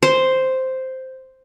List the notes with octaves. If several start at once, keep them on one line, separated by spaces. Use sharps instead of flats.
C5